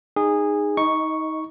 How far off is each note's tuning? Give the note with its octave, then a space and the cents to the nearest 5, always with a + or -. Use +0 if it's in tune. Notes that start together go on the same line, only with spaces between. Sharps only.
D#4 -20 G#4 -15
D#4 +25 D#5 +0 C#6 +0